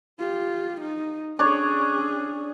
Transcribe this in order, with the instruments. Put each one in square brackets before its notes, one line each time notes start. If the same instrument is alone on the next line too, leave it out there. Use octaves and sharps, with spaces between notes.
[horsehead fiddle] F4 G4
D#4
[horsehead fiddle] C#4 G#4 [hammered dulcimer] D4 C#5